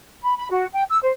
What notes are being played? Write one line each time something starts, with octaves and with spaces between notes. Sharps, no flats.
B5
B5
F#4
G5
E6
C5